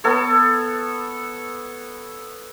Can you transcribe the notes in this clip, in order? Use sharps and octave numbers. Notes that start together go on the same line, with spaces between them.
B3 A4 C#5